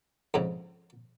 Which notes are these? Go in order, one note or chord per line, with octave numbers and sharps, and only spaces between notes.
F2 G#2 C#3